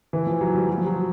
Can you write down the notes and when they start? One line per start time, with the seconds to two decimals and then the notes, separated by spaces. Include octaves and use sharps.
0.13 E3
0.27 F3
0.41 F#3
0.55 G3
0.69 F#3
0.78 F3
0.87 F#3